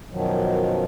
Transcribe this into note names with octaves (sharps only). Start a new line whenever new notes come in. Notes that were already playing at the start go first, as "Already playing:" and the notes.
F#2 B2 D#3 F3 F#3